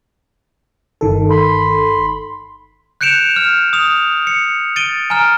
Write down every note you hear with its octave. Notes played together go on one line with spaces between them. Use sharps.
G1 D#3 A4
B5 C6
F#6 G6 C#7 D7 E7 F7
F6
D#6 F7
C#7
A6 D7 D#7 G7
G#5 A#5 F6